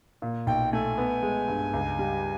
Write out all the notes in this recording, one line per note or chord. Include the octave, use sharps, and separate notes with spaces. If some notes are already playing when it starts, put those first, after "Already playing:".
A#2
B1 G5
A3 G#5
B3
G#3
G2
C#2
G3